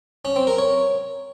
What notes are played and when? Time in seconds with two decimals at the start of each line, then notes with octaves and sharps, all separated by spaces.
0.25 C#4
0.36 C4
0.47 A#4
0.58 C#5